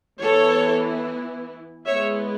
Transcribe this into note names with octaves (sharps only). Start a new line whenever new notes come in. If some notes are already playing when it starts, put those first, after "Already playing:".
E3 B3 E4 A4 C#5
G#3 B3 E4 C#5 E5